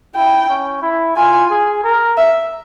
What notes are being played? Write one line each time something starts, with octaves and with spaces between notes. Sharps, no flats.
E4 G5
C#4
E4
F4 G#5
G#4
A#4
E5